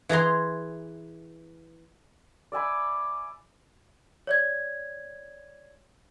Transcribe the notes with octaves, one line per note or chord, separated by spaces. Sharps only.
E3 G#4 A#5 C6
D5 E5 G#5 B5
C#5 D5 G#6